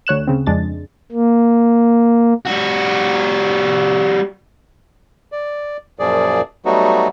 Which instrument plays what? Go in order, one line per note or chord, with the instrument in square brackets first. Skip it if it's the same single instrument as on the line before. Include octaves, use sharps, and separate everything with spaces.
[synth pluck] D2 C#5 F#6 E7
C#3 C4
F2 G#3 D4 A6
[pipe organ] A#3
[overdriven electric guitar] G3 F#4
[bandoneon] D5
F#2 A#2 F3 G#4 D5
F#3 G3 A3 B3 D#4 F#4